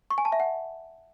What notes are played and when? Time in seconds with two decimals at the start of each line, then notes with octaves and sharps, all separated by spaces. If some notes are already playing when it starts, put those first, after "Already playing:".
0.10 C#6
0.18 G#5
0.25 A5
0.32 E5
0.40 F#5